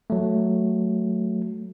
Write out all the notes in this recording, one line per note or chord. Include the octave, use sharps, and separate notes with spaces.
F#3 A3